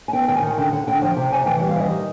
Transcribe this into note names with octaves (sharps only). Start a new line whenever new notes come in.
G#5
B3 G5
D#3 G5
G#5
D#3 F#5
D3 G5
D3 F#5
D3 G5
F3 G5
C3 G5
C3 G#5
E3 G5
F#5
G3
F5
E3 D#5
D#3